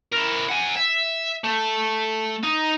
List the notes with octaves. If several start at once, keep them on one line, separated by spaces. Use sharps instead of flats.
E4 A#4
F#5 G#5
E5
A3
D#4